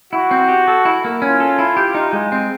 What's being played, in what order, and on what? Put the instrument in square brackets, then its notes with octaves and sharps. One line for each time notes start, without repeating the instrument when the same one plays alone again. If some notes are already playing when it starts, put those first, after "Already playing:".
[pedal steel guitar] E4 [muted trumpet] F#4
[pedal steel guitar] C4
G4
A4
E4
A#3
[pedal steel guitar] C#4 [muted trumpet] F4
[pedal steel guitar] A4
E4
G4
D#4
G#3
C4